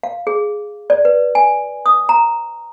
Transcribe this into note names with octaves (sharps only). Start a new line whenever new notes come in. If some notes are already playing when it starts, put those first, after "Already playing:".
F5
G#4
D5
B4
G#5
D#6
A#5